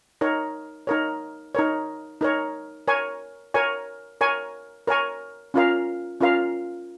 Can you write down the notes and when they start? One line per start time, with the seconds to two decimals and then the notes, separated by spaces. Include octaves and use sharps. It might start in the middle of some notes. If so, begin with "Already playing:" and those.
0.21 D#4 A#4 C#5
0.87 D#4 A#4 C#5
1.55 D#4 A#4 C#5
2.21 D#4 A#4 C#5
2.87 A#4 C#5 G#5 C#6
3.54 A#4 C#5 G#5 C#6
4.21 A#4 C#5 G#5 C#6
4.87 A#4 C#5 G#5 C#6
5.54 C#4 F4 A#4 F5
6.20 C#4 F4 A#4 F5